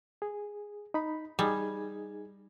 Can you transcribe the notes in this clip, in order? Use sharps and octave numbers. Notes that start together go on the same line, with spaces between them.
G#4
D#4 B5
G3 D#4 G#4 G#6